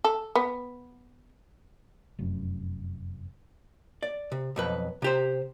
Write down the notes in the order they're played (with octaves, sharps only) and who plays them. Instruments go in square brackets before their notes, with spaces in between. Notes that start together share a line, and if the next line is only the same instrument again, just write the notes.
[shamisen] A4
B3
[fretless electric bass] F1 F#2
[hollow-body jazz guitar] D5
C3
B1 F2 B4
C3 G4 C5